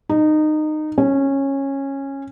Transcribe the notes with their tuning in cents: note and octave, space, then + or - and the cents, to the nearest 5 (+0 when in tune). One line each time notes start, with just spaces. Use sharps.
D#4 -20
C#4 -15